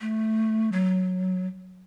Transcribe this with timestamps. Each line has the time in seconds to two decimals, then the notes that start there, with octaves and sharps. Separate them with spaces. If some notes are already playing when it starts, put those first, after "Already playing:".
0.01 A3
0.72 F#3